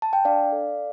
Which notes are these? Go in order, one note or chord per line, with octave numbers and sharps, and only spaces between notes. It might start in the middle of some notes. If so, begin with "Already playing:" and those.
A5
G5
D4 D5 F5
A4